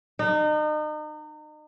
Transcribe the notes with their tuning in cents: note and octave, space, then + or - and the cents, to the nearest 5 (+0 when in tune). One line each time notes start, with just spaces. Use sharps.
D#4 -35